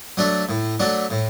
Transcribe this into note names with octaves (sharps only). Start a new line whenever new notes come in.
F#3 A3 D4
A2
F#3 A3 D4
A2